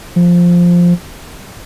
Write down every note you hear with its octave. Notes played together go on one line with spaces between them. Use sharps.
F3